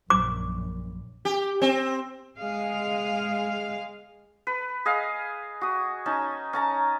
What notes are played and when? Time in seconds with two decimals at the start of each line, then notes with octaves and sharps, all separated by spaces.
0.10 A#1 F#2 D6
1.25 G4
1.62 C4
2.38 G#3 G#4 F5
4.47 B4
4.85 G#4 D#5 F5
5.61 F#4 D#6
6.06 C#4 D#4 A5
6.53 C#4 A5 A#5